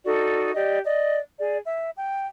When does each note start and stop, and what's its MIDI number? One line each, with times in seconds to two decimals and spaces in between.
0.05 0.52 63
0.05 0.52 66
0.05 0.52 69
0.05 0.52 74
0.55 0.78 67
0.55 0.78 74
0.55 0.78 75
0.84 1.18 74
0.84 1.18 75
1.39 1.57 68
1.39 1.57 74
1.65 1.90 76
1.96 2.26 79